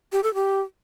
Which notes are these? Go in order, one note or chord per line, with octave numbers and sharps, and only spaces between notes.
G4
A4
G4